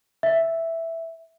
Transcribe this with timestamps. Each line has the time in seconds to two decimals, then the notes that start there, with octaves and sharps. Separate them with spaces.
0.23 E5